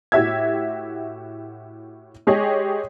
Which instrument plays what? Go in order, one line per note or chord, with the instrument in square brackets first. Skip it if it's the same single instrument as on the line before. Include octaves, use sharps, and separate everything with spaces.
[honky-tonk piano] A2 F#4 G4 E5 E6 G#6
G#3 G4 G#4 C#5 D#5